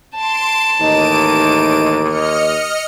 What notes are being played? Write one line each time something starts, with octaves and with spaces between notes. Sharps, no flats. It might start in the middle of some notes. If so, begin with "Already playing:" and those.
A5 C6 D7
A1 D#2 D#4 D7 D#7
D#5 F6 C#7